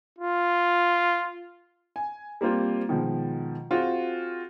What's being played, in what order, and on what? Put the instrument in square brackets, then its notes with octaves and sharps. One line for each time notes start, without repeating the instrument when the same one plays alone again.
[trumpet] F4
[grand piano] G#5
G3 A#3 C4 F4 C5
B2 D#3 F3 G#3
C4 F4 F#4 G#4